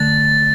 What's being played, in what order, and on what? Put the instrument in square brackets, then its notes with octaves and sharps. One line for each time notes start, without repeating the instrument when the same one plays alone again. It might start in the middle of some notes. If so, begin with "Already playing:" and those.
Already playing: [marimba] D3 A3 [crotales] A6